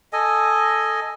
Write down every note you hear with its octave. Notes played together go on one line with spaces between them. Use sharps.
A4 D#5 G#5